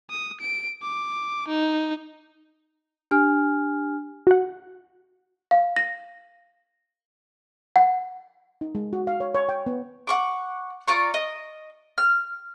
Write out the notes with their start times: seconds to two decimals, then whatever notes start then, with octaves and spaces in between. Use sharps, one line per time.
0.11 D#6
0.41 D7
0.82 D6
1.48 D#4
3.11 D4 G4 G#5 F6
4.27 F#4 F#5
5.51 F5
5.76 A#6
7.76 F#5
8.61 D#4
8.75 G#3
8.93 F#4
9.07 F5
9.20 C#5
9.35 C#5
9.49 G5
9.66 B3
10.07 F#5 C#6 D6
10.88 F4 D5 A#5 C#6
11.14 D#5
11.98 F6